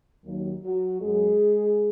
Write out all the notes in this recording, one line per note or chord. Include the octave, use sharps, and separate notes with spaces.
D#2 D#3 F#3
F#3 F#4
F#2 F#3 G#3 G#4